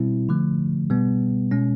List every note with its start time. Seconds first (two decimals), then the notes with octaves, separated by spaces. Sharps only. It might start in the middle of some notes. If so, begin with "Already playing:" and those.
Already playing: B2 G3 C4 E4
0.29 D3 F3 A3
0.90 B2 G3 B3
1.51 B2 G#3 C#4